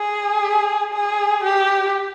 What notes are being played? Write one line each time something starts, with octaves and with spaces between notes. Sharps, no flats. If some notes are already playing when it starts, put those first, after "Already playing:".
Already playing: G#4
G#4
G4